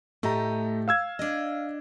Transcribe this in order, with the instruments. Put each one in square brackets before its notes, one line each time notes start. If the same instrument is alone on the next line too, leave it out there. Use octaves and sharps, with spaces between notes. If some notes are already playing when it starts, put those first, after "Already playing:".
[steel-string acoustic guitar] A2 G4 D#5 [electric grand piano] A3 A#5
[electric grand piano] F5 E6 G#6
[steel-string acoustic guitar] D4 D#5